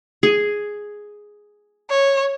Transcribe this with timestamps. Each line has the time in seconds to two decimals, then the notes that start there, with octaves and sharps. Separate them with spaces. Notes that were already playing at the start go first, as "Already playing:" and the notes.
0.23 G#4
1.90 C#5